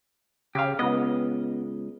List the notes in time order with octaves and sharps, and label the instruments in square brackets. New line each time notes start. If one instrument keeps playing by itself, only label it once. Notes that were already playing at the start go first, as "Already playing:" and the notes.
[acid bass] C#3 [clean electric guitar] G4 F5
[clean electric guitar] C#2 D#5 [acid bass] B3